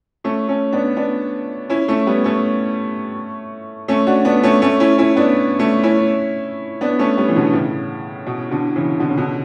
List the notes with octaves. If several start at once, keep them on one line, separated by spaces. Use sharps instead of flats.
A3 C#4
A3 C#4
B3 D4
B3 D4
C#4 E4
A3 C#4
G3 B3
A3 C#4
A3 C#4
D4 F#4
B3 D4
A3 C#4
A3 C#4
C#4 E4
C#4 E4
B3 D4
A3 C#4
C#4 E4
B3 D4
A3 C#4
G3 B3
E3
B2 D3
A2 C#3
B2
B2 D3
C#3 E3
B2 D3
C#3
B2 D3